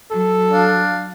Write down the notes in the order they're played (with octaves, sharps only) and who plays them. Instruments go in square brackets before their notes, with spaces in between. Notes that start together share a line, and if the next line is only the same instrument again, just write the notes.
[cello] F#3 [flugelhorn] A4
[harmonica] D4 F5